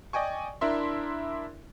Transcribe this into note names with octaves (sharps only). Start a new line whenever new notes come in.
D5 D#5 G5 G#5 C#6
D4 E4 A#4 E5 C6